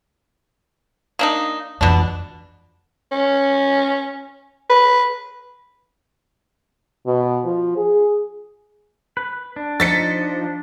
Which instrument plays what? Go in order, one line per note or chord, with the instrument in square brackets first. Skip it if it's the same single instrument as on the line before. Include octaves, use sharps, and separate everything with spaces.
[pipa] A#3 D4 D#4
[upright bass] F2 E3 [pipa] B2 D4
[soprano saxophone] C#4
B4
[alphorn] B2
F3
G#4
[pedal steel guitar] B4
D4
[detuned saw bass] F3 [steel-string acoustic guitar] D#4 C5 D#5 [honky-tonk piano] A6 B6 C#7